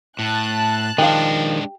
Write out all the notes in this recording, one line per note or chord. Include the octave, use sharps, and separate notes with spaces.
A2 A5 F#6
D#3 F3 G#3 D4 G4 F5